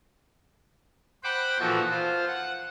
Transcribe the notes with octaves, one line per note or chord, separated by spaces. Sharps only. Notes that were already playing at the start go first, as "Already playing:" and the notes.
C5 F#5 G5 B5 D6
A#2 E3 F3 D#4 F#4 A4
F4 C5
F#5